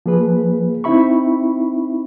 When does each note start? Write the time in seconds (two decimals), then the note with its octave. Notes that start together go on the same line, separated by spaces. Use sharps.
0.06 F3 A#3 G#4 B4
0.84 C4 D#4 E4 E5 B5 C#6